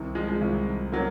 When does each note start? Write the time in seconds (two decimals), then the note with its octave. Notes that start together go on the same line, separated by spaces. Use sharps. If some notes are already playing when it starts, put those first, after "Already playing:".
Already playing: C2 C3 D#3
0.15 F3 G#3
0.28 F3 G#3
0.41 C2 C3 D#3
0.92 F#3 A#3